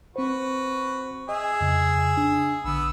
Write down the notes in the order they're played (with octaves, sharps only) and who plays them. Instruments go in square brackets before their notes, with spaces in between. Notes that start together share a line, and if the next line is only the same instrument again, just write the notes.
[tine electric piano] C4 C5 [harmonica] F#4 B4
[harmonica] G#4 E5 [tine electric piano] D#5
[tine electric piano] F2 C#3
D4
[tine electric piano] A#1 D3 [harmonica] B3 E6